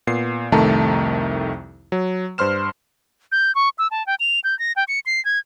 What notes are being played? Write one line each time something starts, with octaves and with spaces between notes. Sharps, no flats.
A#2 B3 C7
C2 F2 D#3 A3 A5 A#5
F#3
G2 C5 C6 F6 E7
G6
C#6
E6
A5
G5
F7
G6
A#6
G5
C#7
C7
G#6